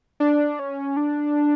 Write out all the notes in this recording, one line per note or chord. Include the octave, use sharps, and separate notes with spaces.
D4
C#4
D4